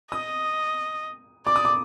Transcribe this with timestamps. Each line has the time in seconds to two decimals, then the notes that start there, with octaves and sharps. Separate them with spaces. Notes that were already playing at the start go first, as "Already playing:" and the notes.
0.11 D#5 D#6
1.46 D5 D6
1.56 D#6
1.65 D6